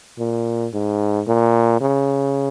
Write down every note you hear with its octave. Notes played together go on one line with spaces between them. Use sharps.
A#2
G#2
A#2
C#3